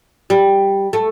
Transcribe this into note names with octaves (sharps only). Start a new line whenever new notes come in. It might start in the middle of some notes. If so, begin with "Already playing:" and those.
G3
A3